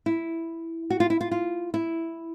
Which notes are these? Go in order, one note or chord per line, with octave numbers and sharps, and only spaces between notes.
E4
F#4
F4
E4
F4
F4
E4